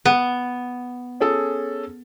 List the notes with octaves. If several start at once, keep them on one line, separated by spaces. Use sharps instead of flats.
B3
C#4 G#4 A4